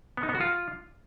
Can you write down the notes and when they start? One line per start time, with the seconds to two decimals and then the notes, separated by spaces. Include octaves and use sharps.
0.17 B3
0.23 D#4
0.29 B3
0.35 F#4
0.41 F4